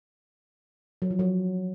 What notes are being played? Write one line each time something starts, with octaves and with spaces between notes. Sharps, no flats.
F#3
F3
F#3